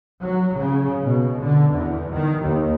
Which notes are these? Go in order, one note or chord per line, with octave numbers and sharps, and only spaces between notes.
F#3
C#3
B2
D3
E2
D#3
D#2